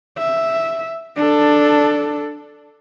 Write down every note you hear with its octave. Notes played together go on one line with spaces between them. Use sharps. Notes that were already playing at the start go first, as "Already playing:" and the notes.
E5
D4 A4